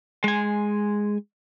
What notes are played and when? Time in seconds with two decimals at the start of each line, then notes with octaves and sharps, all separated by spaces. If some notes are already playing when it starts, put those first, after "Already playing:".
0.24 G#3 G#5